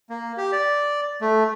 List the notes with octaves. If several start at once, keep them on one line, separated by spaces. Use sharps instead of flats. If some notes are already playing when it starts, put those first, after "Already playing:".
A#3
G4
D5
A3